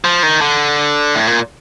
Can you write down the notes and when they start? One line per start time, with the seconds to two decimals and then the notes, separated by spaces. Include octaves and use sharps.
0.05 F3
0.23 D#3
0.41 D3
1.15 A2
1.27 A#2